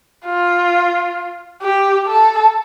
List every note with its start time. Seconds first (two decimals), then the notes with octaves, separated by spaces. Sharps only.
0.25 F4
1.62 G4
2.07 A4